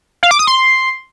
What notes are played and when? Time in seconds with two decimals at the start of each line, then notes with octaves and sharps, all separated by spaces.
0.23 F5
0.31 D6
0.39 D#6
0.47 C6